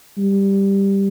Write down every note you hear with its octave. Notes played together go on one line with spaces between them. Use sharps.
G3